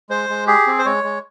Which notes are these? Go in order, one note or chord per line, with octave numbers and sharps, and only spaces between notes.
G#3 C5
G#3
G4 G#4
C4
C5
G#3 C#5
G#3